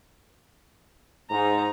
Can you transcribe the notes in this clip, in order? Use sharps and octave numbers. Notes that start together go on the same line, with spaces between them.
G#2 D#4 A#5